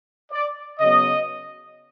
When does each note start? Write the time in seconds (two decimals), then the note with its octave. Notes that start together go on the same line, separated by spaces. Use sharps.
0.32 D5
0.79 C#3 F#3 B3 D#5